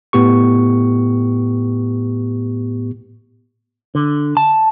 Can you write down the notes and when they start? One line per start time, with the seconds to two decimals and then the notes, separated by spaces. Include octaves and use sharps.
0.13 A2 B3 G4 C#6
3.95 D3
4.37 A5